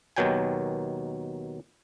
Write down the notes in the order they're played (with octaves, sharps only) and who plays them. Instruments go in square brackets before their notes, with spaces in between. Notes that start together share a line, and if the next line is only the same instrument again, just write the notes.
[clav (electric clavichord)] D#2 B2 D#3 F#3 G5 G#5